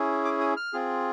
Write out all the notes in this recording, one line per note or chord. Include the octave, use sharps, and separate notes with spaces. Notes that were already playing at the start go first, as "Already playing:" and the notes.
Already playing: C#4 E4 G#4
D6
D#6
F6
C4 F4 G#4